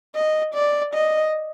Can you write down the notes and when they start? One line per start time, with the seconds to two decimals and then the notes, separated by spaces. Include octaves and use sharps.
0.15 D#5
0.55 D5
0.94 D#5